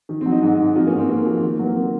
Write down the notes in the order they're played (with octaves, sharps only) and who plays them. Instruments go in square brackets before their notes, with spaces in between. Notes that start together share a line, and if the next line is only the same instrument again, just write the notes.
[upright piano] D#3
C4
F#3
C4 D#4
G#2 C4 D#4
G#2
F3 C4 D#4
A#3 C#4
G#2
C4
G#2 A#3
F3
D#3
F#3
A#3
C4